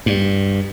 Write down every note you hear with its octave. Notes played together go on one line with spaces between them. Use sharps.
G2